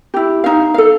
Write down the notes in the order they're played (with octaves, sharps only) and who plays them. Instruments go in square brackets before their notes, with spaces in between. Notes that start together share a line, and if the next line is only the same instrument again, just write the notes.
[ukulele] E4 G4
D#4 F5
A4 F5